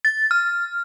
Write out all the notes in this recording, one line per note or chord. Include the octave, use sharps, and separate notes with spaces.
A6
F6